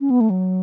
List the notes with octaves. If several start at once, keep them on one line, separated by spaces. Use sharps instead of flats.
C#4
B3
A3
F#3